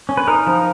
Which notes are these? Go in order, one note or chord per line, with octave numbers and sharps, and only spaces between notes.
C#4
B4
D#4 A#4
F3